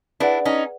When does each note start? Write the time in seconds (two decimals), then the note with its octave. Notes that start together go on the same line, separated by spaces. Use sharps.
0.20 D4 E4 G#4 B4 D5 F#5
0.45 C#4 D#4